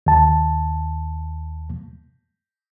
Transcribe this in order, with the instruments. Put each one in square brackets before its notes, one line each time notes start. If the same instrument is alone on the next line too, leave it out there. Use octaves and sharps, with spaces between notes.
[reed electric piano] D#2 A5